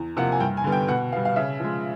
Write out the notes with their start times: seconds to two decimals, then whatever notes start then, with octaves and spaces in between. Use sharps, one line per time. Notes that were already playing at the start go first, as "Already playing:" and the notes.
Already playing: E2
0.17 C3 F3 A#3 F#5
0.32 G#5
0.40 G2 G5
0.57 G#5
0.64 D3 G3 B3
0.72 G5
0.88 B2 F#5
1.12 B3 F5
1.16 G3
1.25 F5
1.36 C#3 E5
1.60 F3 G#3